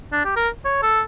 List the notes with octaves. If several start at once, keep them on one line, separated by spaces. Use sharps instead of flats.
D4
G4
A#4
C#5
A4